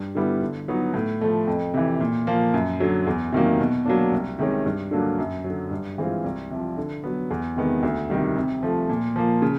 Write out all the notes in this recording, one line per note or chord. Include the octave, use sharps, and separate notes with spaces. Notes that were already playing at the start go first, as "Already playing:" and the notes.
Already playing: G2
D3 G3 B3 E4
D3
F#3 B3 D#4 F#4
A2
F3 A3
F2
C3 E3
A#2
F3 A#3
F#2
D3 F#3
E2
C3 D#3 F#3 A#3
B2
F#3 A#3 D4
C2
C3 D#3 G#3 C#4
G2
D3 F#3 A#3 D4
F#2
F#3
D3
G2
E3 G#3 C4 F4
C2
C3 F3
D3
F#3 B3
E2
C3 D#3 G#3 B3
D2
C3 D#3 G3
C3
F3 A3
A#2
F3 A#3
C#3